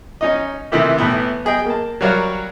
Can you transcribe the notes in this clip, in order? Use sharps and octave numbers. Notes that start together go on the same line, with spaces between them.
C#4 D#4 D#5
C3 D#3 E3 A3 E4 G4
A2 E3 B3
B3 G#4 D#5 G5
A#3 A5
F#3 G3 F#4 A#4 C#5 F5